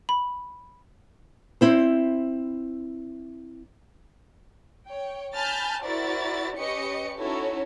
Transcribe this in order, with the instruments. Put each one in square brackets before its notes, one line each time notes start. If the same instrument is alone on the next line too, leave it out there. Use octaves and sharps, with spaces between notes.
[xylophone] B5
[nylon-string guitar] C4 E4 C5
[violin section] C#5 G5
G#5 A5 B5 F6 G6 A6
E4 F#4 A#4 C5 D5 A6
C#4 G4 B4 D#5 C#6 C#7
C#4 D#4 E4 F#4 A4 C#5